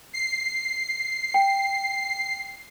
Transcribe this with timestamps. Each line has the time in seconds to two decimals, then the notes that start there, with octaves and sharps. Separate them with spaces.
0.13 C7
1.34 G5